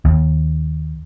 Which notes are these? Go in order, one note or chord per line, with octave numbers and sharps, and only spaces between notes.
D#2